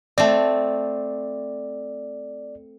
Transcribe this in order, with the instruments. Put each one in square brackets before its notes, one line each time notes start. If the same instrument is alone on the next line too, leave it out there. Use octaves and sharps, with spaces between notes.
[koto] A3 C4 [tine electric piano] D5